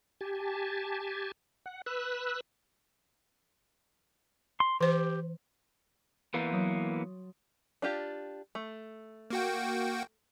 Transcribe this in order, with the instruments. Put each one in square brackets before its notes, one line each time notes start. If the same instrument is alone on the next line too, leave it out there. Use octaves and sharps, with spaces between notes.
[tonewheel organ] G4 G#5 A5
F#5
B4 E6 F#6
[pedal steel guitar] C6
[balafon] E3 C5 [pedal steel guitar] G4
[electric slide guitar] E3 A#3 B3 [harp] C6 G6 A6
[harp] F#3 D#6 D7
[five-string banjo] D4 F4 G4
A3
[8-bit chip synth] A#3 F#4 G5